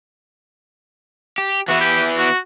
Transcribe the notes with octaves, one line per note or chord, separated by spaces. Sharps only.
G4
E3 B3 E4 F#4
G4
F#4